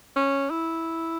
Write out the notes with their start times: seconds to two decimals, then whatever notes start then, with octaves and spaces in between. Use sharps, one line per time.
0.16 C#4
0.50 E4